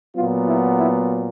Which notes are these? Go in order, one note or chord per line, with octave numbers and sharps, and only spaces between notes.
A#2 F#3 B3 F4
E4
E4